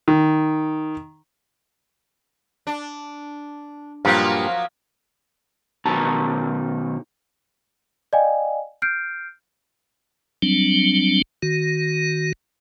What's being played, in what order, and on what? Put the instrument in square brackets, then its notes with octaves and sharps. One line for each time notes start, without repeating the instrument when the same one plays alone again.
[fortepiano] D#3
[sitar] D4
[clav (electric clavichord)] G2 A#2 [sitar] F3 F#3 A#3
[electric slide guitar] B2 D#3 A5 A#5
[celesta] D5 D#5 F5 G5 G#5
F6 G6 C7 D7
[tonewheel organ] F#3 G3 C4 D4
D#3 F#4